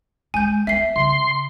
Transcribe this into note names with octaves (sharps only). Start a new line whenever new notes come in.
G#3 G#5 G6
B3 E5 C7
C#3 C6